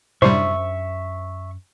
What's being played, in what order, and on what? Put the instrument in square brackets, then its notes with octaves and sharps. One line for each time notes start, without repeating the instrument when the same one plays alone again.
[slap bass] F#2 [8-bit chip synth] A2 C3 G3 [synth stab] D4 C5 [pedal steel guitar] E5 C#6